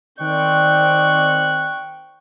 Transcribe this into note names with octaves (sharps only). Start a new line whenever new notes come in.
D#3 C4 D5 G5 C#6 F#6